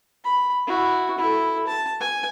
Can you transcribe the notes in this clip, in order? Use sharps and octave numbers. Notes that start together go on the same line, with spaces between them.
B5
E4 F#4
E4 A4
A5
G#5